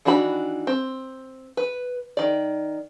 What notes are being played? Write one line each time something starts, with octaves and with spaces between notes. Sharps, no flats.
D#3 E3 D4 F#4 B5
C4
B4
D#3 D5